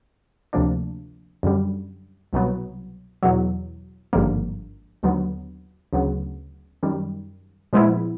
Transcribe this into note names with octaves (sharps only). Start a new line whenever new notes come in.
D2 C3 F3 A#3 D4
F#2 D3 G3
C2 B2 F#3 B3
E2 B2 F#3
G#1 G2 D3 F3 A#3
D#2 D3 F#3 B3
D2 C#3 F#3 B3
F#2 D#3 G3
A#2 F3 G#3 B3 E4